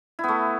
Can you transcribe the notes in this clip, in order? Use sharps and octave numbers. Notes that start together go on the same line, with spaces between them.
A3 B3 E4